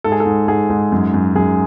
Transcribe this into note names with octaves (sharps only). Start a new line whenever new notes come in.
G#2 A4
G#4
A4
G#2
G#2 G#4
G#2
F#2
F#2
F#2 G#4